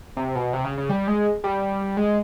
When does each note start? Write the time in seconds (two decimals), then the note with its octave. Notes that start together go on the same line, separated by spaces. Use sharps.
0.17 C3
0.35 B2
0.53 C3
0.64 C#3
0.78 C#3
0.89 G3
1.08 G#3
1.44 G3
1.97 G#3